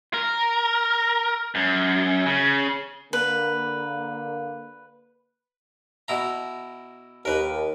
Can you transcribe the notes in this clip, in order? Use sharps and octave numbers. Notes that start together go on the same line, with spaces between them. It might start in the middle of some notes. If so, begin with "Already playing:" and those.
A#4
F#2
C#3
D3 A#3 B4
B2 E4 A#5
D#2 A#4 B4